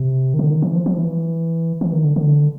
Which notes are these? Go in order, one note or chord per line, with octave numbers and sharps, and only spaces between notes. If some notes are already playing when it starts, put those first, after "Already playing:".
Already playing: C3
D#3
D3
D#3
E3
F3
F3
E3
E3
D#3
D3
D3